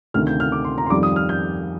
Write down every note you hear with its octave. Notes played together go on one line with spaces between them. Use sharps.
D2 C3 D#3 F6
G6
F6
D6
C6
A#5
C6
F2 D#3 G3 D6
D#6
F6
G6